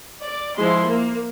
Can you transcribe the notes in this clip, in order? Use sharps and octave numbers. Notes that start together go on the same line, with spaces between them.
D5
F3 G#3 E4 C6
A#3